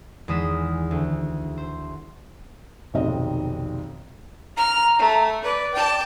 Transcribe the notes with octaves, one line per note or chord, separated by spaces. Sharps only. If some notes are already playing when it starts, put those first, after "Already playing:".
E2 D#3 G#3 D#6 B6 E7
D2
C5
F1 B1 D#3 C4 D#5
A#5 F6
A3
B4 D5
G5 A5